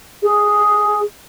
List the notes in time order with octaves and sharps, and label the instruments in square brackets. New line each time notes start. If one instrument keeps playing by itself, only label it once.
[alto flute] G#4